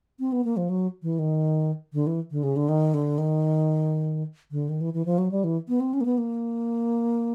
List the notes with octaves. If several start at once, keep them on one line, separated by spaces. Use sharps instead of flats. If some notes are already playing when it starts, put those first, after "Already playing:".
C4
B3
A#3
F3
F#3
E3
D#3
D3
E3
D3
C#3
D3
D#3
D3
D#3
D3
D#3
E3
E3
F3
F#3
G3
E3
B3
C4
C#4
A#3
B3
A#3